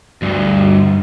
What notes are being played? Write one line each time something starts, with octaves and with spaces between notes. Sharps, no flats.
D2 G2